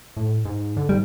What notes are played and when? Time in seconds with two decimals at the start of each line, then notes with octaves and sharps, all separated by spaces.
0.17 A2
0.45 G#2
0.77 D3
0.89 G#2 G3